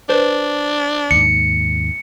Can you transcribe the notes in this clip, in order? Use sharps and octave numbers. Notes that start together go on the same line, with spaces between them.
D4 B4 C5
D#2 G#2 C#7